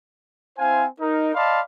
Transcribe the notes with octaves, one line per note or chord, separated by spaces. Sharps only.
C4 E4 C5 F5 G#5
D#4 A#4
D5 D#5 F5 A5 B5 C6